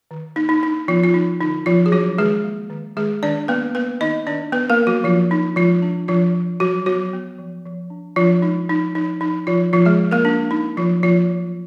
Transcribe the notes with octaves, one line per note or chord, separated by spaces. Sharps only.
D#3
A#3 D#4
D#4
D4 D#4
F3 B3 F4
F4
F3 D#4
D3 D#4
F3 B3 F4
G#4
F#3 D4 F#4
D#3 G#3 G#4
A#3
D#3
D#3 G#3 G#4
D#3 D4 D5
A#3 B3 B4
A#3 B3 B4
D#3 D#4 D#5
D#3 D4 D5
B3 B4
A#3 A#4
B3
F#3 F#4
F3 D4 F4
D4 D#4
F3 G#3 F4
D4
F3 D4 F4
F3
F3 F#3 F#4
F#3 B3 F#4
B3
F3
F3
D4
F3 D4 F4
G#3 D#4
F3 D#4
F3 D#4
F3 D#4
F3 F4
F3 A#3 F4
G#3 G#4
F3
A#3 A#4
D4
A#3 D#4
F3 F#3 F4
F3 A#3 F4
F#3